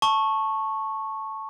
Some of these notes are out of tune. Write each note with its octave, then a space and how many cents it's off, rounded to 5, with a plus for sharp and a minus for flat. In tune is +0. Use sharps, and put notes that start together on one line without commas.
A5 +0 C#6 -10